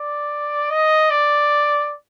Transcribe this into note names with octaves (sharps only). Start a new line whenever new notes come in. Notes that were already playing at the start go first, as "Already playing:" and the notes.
Already playing: D5
D#5
D5